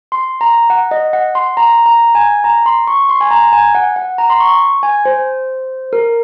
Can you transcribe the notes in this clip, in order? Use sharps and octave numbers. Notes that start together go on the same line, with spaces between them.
C6
A#5
F#5
D#5
F#5
C6
A#5
A#5
G#5
A#5
C6
C#6
C6
G#5
A#5
G#5
F#5
F#5
A#5
C6
C#6
G#5
C5
A#4